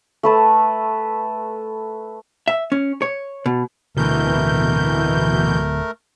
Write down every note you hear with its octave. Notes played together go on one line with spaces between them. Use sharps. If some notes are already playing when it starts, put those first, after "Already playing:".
A3 B4 A5
E5
C#4
C#5
B2
D1 B2 D3 E3 A3 A#4 G6